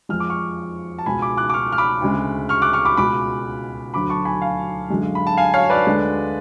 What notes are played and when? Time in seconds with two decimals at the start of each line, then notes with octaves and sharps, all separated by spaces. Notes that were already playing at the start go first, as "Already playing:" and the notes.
0.09 F2 F3 G#3 F6
0.20 D6
0.30 C#6 F6
0.99 A5
1.06 C#2 B2 G#3 G#5 B5
1.22 B5 D6
1.37 D6 F#6
1.50 D6
1.54 C#6 F6
1.72 F6
1.78 B5 D6
2.01 D2 C#3 G#3
2.49 C#6 F6
2.62 D6 F#6
2.73 C#6 F6
2.85 B5 D6
2.97 C#2 B2 G#3 B5 D6
3.94 D2 D3 F#3 B5 D6
4.10 A5 C#6
4.25 G#5 B5
4.41 F5 G#5
4.90 F#2 D3 G#3
5.15 B5
5.27 A5
5.37 F5 G#5
5.54 C#5 F5
5.70 B4 D5
5.85 D2 D3 G#3